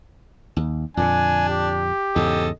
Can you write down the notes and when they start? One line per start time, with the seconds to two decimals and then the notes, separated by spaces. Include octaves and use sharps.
0.57 D#2
0.97 F2 A#2 D3 D4 G#5
1.49 G4
2.16 E2 G#2 C#3 A4 D#5